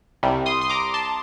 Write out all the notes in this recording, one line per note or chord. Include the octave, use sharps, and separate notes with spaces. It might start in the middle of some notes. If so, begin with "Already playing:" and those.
C2 C3 G3
C6 D#6
C6
A#5 D6
A5 C6